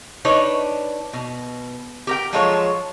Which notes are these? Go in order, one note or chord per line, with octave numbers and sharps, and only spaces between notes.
D4 D#4 B4 C#5
B2
G4 A#4 G5
F3 F#3 G#3 F4 A4 C#5